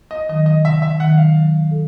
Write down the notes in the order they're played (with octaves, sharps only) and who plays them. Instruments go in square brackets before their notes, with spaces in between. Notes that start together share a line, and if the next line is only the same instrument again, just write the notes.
[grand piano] D#5
[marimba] D#3 F#3 [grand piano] D#5
[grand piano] D#5
[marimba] C3 [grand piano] E5
[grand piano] E5
[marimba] D#3 F#3 [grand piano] F#5
[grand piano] F5
[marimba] F#3
A4